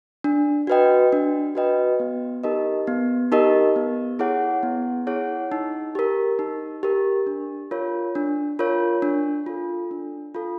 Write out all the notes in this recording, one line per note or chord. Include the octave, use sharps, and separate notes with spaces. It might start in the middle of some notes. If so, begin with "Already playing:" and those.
D4
F#4 B4 D#5 G5
D4
F#4 B4 D#5 G5
B3
D#4 G4 A#4 D#5
B3
D#4 G4 A#4 D#5
B3
E4 G#4 C#5 F#5
B3
E4 G#4 C#5 F#5
D#4
G4 A#4
D#4
G4 A#4
D4
F4 A#4 C#5
D4
F4 A#4 C#5
D4
F4 A4
D4
F4 A4